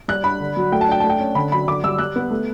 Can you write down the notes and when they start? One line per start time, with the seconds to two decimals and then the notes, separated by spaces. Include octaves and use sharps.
0.08 G3 F#6
0.24 D4 B5
0.40 D3
0.57 F#3
0.72 A3 G5
0.81 A5
0.88 D4 G5
1.00 A3 A5
1.10 G5
1.19 C#4
1.35 D3 B5
1.52 F#3 B5
1.68 D3 D6
1.83 G3 E6
1.99 G3 F#6
2.16 B3
2.30 A3